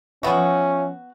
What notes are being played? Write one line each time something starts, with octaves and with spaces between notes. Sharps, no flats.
F3 B3 C#4 F#4 E5